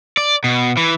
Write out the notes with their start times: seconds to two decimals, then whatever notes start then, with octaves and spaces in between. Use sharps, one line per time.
0.17 D5
0.44 B2
0.77 E3